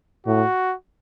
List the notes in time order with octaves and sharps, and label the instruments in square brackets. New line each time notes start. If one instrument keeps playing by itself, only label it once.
[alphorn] A2 [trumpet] F#4